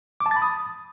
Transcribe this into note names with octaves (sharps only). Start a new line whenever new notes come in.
D6
A5
A6
B5
D#6